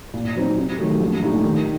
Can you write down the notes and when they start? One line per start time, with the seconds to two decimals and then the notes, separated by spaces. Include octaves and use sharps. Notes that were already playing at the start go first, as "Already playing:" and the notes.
0.14 A#2
0.35 F#3 C4 D#4
0.57 C3
0.78 D#3 F#3 A3
1.00 A#1
1.22 A#2 A3 D#4 G4
1.44 D#3